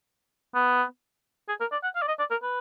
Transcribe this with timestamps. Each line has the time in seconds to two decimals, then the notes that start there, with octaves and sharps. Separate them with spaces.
0.55 B3
1.48 G#4
1.60 A#4
1.72 D5
1.83 F#5
1.95 F5
2.02 D5
2.08 D#5
2.19 D5
2.31 A#4
2.43 B4